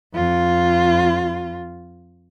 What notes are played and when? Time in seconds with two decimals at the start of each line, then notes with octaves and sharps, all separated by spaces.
0.14 F2 F4